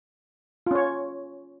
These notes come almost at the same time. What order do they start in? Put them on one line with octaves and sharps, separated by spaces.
F4 C#4 C#5